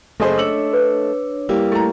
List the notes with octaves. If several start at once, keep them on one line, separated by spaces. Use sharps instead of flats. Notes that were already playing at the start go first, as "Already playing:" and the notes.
F#1 A3 G#4 C5 D#5
D4 C#5 E6 F#7
B4
G3 A#3 E4 G4
A3 A#5